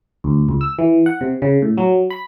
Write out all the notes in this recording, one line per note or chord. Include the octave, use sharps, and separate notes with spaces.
D2
C#2
E6
E3
F#5
C3
C#3
A2
F#3
B5